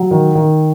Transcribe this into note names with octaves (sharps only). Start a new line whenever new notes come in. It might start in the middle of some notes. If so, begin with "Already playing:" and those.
Already playing: F#3
D#3
D#3